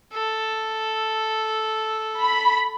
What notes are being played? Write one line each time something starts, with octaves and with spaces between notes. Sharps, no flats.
A4 E6
B5